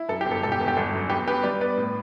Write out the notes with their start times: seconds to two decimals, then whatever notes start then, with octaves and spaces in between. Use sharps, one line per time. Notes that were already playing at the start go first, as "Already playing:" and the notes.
Already playing: E4
0.09 F#2 A4
0.21 G4
0.26 G1
0.31 A4
0.43 E1 A4
0.52 G4
0.60 E2 A4
0.68 G4
0.77 G1 A4
0.93 F#2
1.09 B3 G4 B4
1.26 B3 G4 B4
1.43 G3 B4 D5
1.60 B3 B4 D5
1.77 A2